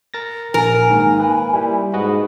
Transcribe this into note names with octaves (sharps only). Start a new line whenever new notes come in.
A#4 A6 A#6
A#1 A#4 G#5
G#2 D#3 A#3
B4
G3 E4
G#2 F#4 B4 D#5